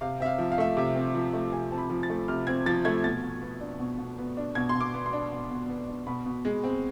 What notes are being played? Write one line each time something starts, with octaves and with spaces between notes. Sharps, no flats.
C3 F5
C4 E5
F5
F3
F5
A3 E5
C3 E5
C4
F3
A3
C3 G#5
C4 A5
B5
F3
A6
A3
C3 F6
C4 G#6
F3 A6
A3 G#6
B2 A6
B2
B3
D4
B2
B2
B3
D4
B2 G#6
C6
B2
D6
B3
C6
D4
B2
B2
B3
D4
B2 B5
B2
G#3
C4